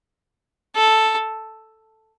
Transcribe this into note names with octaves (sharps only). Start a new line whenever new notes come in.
A4